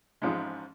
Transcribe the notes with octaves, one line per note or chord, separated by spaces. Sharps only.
A1 G#2 F3 G#3